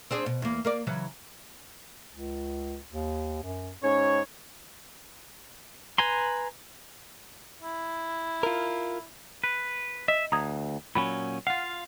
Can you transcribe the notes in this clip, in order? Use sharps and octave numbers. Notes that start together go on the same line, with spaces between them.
C4 D4 G#4
B2
E2 A#3
A#3 A#4 D5
C#3 E3 F#3
C#2
D#2
F#2
G#2 C#4 C#5
B4 G#5 A#5 C6
E4
F4 A#4
B4
D#5 E5
D2 A#5 D#6 G#6
A#2 F#3 C#4 B5
F4 F5 F#5